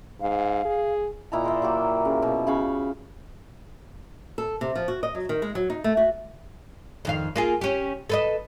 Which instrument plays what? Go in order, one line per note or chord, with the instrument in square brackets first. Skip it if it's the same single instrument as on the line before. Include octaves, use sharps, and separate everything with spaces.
[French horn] G#2 [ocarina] F5
[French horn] G#4
[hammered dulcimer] A#2 E4 D#5 A#5
A#4 C5 D5 E5
F#3 A#3 G4
C#3
B2
C#3 F5 B5 C#6
[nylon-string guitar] A4
C3
F3
F#4
D#5
F#3
D#3
G#3
F#3
D#4
A3
F#4
[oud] F2 D#3 F5
A#3 F4 G#4
C#4 G4
A4 B4 D#5